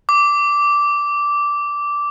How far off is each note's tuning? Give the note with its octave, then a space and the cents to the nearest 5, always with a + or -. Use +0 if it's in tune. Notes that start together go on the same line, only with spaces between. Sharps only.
D6 -10